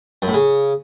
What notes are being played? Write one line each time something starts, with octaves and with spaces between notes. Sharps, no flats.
F#2
A2
C#3